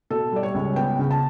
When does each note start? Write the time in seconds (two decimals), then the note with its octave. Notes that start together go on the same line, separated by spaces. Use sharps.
0.10 B2 A4
0.32 G3 D5
0.43 C#5
0.54 C#2
0.76 B3 G5
0.99 C#3
1.11 A5